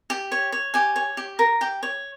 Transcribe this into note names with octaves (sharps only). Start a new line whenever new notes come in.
G4
C#5
C#5
G4 G#5
C#5
G4
A#4
G4 G5
C#5